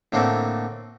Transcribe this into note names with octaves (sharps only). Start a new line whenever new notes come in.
A2 D3 A3 A#3 C4